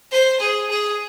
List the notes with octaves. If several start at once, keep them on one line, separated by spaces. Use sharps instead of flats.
C5
G#4
G#4